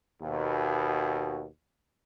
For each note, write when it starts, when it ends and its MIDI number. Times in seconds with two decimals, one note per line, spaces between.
0.21 1.45 39
0.21 1.45 47